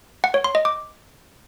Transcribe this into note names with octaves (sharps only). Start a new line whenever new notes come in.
F#5
C#5
C6
D#5
D6